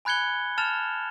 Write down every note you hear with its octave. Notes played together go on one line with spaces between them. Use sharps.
G#5 B5 F#6 G#6 C#7 G7
A5 F6 A6 E7 F7